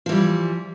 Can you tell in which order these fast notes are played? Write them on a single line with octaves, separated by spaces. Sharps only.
F3 E3 G3